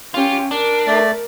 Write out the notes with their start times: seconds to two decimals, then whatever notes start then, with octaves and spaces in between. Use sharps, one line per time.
0.14 C#4 F4 G4
0.51 D4 A#4
0.87 A3 D5